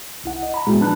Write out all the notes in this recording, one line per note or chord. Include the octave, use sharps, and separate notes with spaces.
C2 E4 F#5
D#5
A#5 B5
A#2 G#3 B3 E4 F#4
F3 D4 B4 A5 B5 F#6